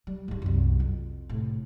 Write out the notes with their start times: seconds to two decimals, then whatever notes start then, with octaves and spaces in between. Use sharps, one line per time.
0.07 G3
0.28 G#2 G3
0.42 C2 F#2
0.80 F2
1.29 A2 C3